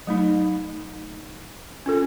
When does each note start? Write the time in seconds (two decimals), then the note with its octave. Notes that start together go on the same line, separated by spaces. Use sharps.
0.07 F#3 A3 D#4
1.86 C#4 F4 A4